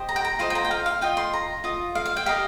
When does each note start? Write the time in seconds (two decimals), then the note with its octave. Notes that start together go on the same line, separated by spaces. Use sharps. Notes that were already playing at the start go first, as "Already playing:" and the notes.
Already playing: G4 C5 D#5
0.09 A#5
0.16 G5
0.25 A#5
0.39 F4 C5 D#5 C6
0.50 G5
0.55 A#5
0.65 G5
0.71 F5
0.86 F5
1.01 F4 D#5 G5
1.17 C6
1.33 A#5
1.64 F4 D#5
1.95 F5
2.06 F5
2.17 G5
2.26 G4 A#4 D#5 F5